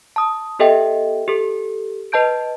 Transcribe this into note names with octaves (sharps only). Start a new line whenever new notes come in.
A5 D#6
B3 G4 A4 D#5 E5 G5
G4 A4
B4 D#5 A5 G6 D7